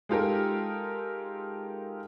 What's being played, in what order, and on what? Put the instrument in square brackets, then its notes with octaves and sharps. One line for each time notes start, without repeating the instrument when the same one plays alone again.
[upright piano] G#3 D#4 F4 G4 A4 A#4